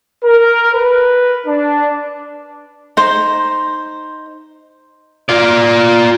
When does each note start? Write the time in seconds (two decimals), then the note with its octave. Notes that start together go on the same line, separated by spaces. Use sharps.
0.24 A#4
0.75 B4
1.47 D4
2.97 D#4 C5
5.29 F4 D5